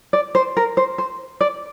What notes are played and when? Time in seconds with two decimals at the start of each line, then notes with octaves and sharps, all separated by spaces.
0.13 D5
0.35 C5
0.57 A#4
0.77 C5
0.98 C5
1.41 D5